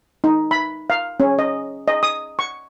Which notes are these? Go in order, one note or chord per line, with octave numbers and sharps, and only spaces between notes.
D#4
B5
F5
C#4
D#5
D#5
D#6
C#6